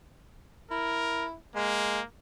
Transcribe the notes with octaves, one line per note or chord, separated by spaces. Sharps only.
E4 A#4
G#3 A#3